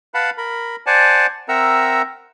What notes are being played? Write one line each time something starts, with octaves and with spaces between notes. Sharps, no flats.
B4 F5 F#5 A5 B5
A#4 B5
C5 D5 F#5 G#5 A5
C4 A#4 E5 F#5 A#5 E6